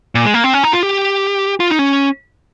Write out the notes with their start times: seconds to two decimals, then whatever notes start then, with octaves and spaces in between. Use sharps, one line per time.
0.15 A#2
0.25 G#3
0.34 A#3
0.44 C4
0.54 C#4
0.64 D#4
0.73 F4
0.83 G4
1.60 F4
1.70 D#4
1.79 C#4